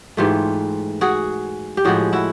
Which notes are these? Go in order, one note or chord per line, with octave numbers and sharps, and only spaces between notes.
G#2 E3 A3 F4 G4
F#4 G#4
G4
A2 F3 G#3 F#4 G#4
E4 F#4